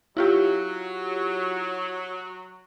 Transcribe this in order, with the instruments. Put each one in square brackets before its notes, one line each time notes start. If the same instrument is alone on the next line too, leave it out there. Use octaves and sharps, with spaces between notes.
[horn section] F#3 [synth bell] E4 F4 G4